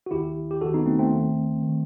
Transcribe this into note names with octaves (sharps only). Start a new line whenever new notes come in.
F#4
D#2 D#3 E4 G4
G4
D#2 D#3 F#4 A4
B3 D#4
A3 C4
A3 C4
D#2 D#3
D#3